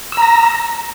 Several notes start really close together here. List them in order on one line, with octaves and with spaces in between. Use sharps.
E6 A#5 A#6